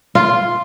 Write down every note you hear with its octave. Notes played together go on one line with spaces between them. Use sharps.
F4